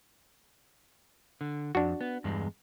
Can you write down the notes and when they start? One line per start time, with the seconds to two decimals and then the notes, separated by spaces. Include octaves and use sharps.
1.41 D3
1.75 F2 D4 F#4
2.01 B3
2.24 E2 G2 G#3